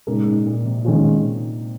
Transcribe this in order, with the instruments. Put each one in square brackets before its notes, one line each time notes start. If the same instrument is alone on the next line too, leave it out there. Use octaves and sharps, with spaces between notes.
[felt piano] A#2 [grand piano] C#3 G#3 D#4 A#4
[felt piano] G#2
A#2
C3
[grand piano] D#3 G#3 C#4 F4